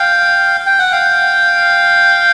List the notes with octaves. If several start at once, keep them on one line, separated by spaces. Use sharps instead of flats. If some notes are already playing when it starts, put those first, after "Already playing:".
Already playing: F5 G5
G5
F#5
F5 G5